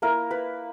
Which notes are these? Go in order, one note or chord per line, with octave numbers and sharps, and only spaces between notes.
A#3 E4 A#4
B4